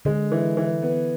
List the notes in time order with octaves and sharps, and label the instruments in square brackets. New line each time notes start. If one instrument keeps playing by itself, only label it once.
[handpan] D3 [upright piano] G#3
[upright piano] E3
E3
B3